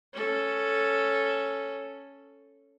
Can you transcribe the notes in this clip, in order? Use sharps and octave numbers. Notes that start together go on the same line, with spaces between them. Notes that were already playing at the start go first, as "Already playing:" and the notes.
C#4 A4